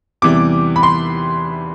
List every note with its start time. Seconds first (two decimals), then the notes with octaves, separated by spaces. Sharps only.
0.22 E2 C3 E3 G3 D6
0.76 B5
0.83 C6